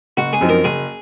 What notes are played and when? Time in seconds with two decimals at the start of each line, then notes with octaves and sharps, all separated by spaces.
0.17 F#1 F#4
0.33 G#4
0.41 F#2 F3 C4 D#4
0.49 A#4
0.64 F#1 G#4